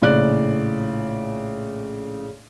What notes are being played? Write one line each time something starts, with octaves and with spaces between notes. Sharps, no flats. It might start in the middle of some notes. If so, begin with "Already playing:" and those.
A#1 A2 C#3 D5 F#6